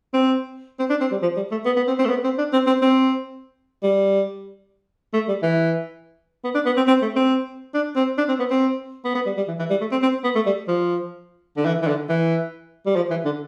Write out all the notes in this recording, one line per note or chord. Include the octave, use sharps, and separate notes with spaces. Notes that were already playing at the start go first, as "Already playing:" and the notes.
C4
C4
D4
C4
G3
F3
G3
A3
B3
B3
C4
C4
A3
B3
C4
D4
C4
C4
C4
G3
A3
G3
E3
B3
D4
B3
C4
C4
A3
C4
D4
C4
D4
C4
B3
C4
B3
B3
G3
G3
E3
E3
G3
A3
C4
C4
B3
A3
G3
F3
D3
E3
E3
D3
E3
G3
F3
E3
D3